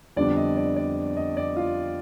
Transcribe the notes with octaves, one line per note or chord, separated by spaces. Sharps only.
F2 D3 G3 B3 D4 D5
D#5
D5
D5
D#5
D5
F4